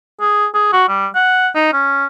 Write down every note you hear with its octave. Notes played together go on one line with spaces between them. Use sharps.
G#4
G#4
F#4
G3
F#5
D#4
C#4